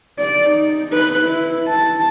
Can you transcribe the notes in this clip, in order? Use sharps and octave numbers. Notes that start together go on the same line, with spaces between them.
D5
D#4
D#4 B4
E4
A5